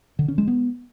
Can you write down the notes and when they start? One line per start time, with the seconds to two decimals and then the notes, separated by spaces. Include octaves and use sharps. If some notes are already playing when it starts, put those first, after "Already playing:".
0.19 D3
0.28 C#4
0.38 G#3
0.47 B3